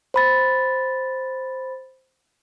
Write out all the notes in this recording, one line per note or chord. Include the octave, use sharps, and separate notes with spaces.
C5 B5 A6